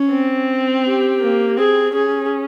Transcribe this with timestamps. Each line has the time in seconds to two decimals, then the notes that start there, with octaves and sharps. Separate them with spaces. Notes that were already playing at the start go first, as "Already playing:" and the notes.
Already playing: C#4
0.10 C4
0.84 G4
1.20 A#3
1.57 C4 G#4
1.94 C#4 G#4